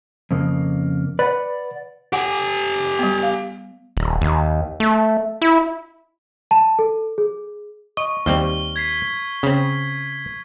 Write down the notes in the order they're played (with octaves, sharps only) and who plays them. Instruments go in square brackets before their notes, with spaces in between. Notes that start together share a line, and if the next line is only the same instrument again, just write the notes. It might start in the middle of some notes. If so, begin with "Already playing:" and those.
[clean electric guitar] F2 C#3 A#3
[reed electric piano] B4 [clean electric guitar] D5 F#5
[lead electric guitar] G4 G#5 [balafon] F#5 D6
[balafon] G3 B3
F5
[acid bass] D#1
D#2
A3
E4
[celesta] A5
A4
G#4
[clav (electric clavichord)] D#5 [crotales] C#6
[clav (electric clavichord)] D#2 G3 C4 [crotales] F6
[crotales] G#6 B6 C7
[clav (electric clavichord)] C#3 C4